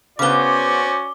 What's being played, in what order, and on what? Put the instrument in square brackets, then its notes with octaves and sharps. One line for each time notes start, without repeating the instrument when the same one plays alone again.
[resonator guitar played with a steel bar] C#3 B3 [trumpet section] C#4 F#4 D5 [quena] C5 [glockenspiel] D6 G7